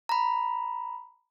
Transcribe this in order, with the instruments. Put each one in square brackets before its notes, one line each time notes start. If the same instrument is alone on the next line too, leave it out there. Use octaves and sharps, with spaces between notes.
[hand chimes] A#5 B5